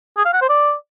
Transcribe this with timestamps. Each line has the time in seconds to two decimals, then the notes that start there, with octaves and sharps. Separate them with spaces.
0.17 G#4
0.25 F5
0.33 F#5
0.41 C5
0.49 D5